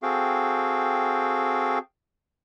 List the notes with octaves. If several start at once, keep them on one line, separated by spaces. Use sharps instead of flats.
C4 F#4 G#4 A4 F5 G5